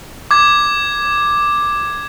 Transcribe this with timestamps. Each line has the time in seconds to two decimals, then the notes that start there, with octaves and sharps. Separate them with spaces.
0.31 D6 G#6